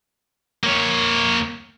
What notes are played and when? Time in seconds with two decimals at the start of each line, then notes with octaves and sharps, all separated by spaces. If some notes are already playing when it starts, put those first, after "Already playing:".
0.64 A#3 C#5